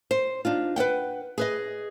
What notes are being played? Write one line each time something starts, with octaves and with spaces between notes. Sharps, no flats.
C5
D4 D#4 F4
B4 D5 F#5 G5
G#4 B4 D#5